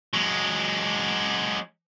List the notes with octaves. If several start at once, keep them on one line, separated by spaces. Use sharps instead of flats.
F#3 G#3